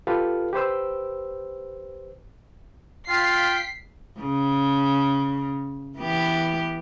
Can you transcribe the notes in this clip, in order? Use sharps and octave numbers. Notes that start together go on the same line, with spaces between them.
F4 G4 A4 B4 F5
G4 B4 C5 E6
F4 F5 G5 B6 C7
C#3
E3 B3 G4